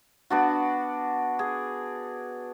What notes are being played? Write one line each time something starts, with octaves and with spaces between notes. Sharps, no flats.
B3 D4 F#4
G#4